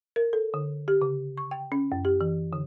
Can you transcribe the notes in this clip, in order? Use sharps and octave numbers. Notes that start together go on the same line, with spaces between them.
A#4
A4
D3
G4
C#3
C#6
G5
C#4
F#2
G4
E3
D3